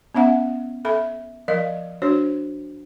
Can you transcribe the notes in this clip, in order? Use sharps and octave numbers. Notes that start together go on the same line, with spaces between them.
B3 C#4 E5 F#5
A4 E5 B5
F3 A#4 D#5 F5
D4 F#4 C5 C#5